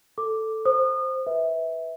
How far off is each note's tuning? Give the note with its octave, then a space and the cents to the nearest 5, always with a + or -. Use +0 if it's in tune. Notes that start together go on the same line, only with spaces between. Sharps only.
A4 +0 D6 +0
C5 +0 D#6 -35
B4 +0 E5 -20